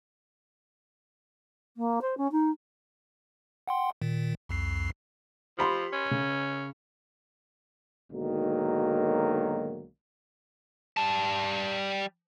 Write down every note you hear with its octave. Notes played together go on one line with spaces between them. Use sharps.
A#3
C5
C#4
D#4
F#5 G5 C6
A#2 D#3
C2 F2 C7
F3 G4 B5 C6
C#4
C#3
B1 G#2 D3 D#3 F#3 A#3
G3 A5